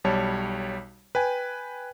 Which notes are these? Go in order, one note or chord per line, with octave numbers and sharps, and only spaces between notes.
B1 G3 C#5 A5
B4 G5 G#5